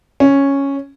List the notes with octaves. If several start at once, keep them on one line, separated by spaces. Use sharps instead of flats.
C#4